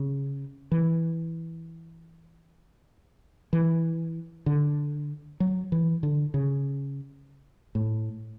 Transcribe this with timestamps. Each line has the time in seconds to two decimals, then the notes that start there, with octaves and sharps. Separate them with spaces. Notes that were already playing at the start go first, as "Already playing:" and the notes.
Already playing: C#3
0.72 E3
3.53 E3
4.46 D3
5.40 F#3
5.72 E3
6.03 D3
6.34 C#3
7.75 A2